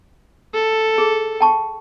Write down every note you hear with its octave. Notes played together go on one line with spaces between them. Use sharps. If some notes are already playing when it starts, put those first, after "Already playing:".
A4
G#4
G5 A5 C#6